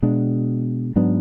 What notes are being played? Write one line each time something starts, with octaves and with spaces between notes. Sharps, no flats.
B2 G#3 D4
G#2 F#3 B3 D4